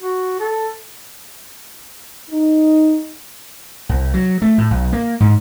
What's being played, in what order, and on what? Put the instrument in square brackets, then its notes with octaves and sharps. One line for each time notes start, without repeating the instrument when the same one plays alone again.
[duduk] F#4
A4
[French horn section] D#4
[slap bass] C2
F#3
A3
A2
B1
A#3
G#2